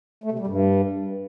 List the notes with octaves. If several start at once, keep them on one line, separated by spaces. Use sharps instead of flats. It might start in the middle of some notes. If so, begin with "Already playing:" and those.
A3
C3
G3
G2